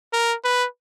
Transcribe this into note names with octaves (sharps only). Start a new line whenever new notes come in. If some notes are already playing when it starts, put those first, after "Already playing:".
A#4
B4